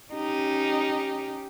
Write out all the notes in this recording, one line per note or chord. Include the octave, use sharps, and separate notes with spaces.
C#4 D#4 G4